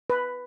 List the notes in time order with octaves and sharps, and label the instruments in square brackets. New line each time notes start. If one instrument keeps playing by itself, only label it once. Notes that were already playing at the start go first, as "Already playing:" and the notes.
[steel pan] B4